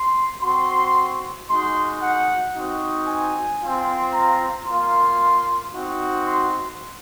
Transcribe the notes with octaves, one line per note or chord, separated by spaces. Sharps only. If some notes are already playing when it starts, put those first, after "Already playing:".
Already playing: C6
C4 F#4 C6
G#3 D#4 F#4 C6
F#5
C4 D#4 F#4
G#5
C4 F4
A#5
A#3 F4 C6
C4 D#4 F#4
C6